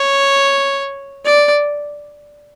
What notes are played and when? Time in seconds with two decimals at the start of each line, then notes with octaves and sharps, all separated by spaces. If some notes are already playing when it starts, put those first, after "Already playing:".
Already playing: C#5
1.25 D5